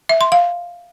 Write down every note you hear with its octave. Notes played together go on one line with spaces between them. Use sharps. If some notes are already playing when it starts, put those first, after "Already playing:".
E5
C6
F5